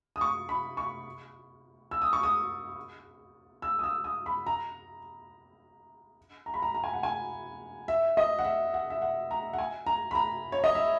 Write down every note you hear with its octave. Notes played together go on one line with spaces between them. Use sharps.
D#6
C#6
B5
C#6
E6
D#6
C#6
D#6
E6
D#6
E6
D#6
B5
A#5
A#5
B5
A#5
A#5
G#5
F#5
G#5
E5
D#5
F#5
E5
F#5
E5
F#5
A#5
F#5
G#5
A#5
B5
A#5
C#5
D#5
E5